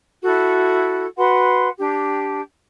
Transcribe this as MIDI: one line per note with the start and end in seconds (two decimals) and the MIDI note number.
0.22 1.04 64
0.22 1.04 66
0.22 1.04 69
1.16 1.67 66
1.16 1.67 71
1.16 1.67 78
1.16 1.67 84
1.78 2.40 62
1.78 2.40 67
1.78 2.40 79